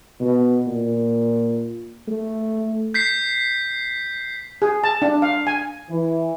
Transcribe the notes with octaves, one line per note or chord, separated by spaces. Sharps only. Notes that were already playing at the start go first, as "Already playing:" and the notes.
B2
A#2
A3
G6 B6 C7
G#4
A5
D4
F5
G#5
E3